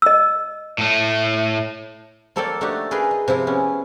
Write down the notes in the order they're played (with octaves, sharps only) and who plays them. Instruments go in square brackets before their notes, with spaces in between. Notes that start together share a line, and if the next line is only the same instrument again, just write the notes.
[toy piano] D#5 E6
[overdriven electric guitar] A2 A3
[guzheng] F3 A#3 A4 C#5 D5 G5
A3 D4 D#4 F#4 G4
G#4 A#4 B4 F5 G5
D#5
C3 F3 E4 F4
B3 C#4